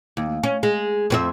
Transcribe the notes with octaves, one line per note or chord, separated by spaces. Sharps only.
D#2
C#4
G#3
F2 C4 E5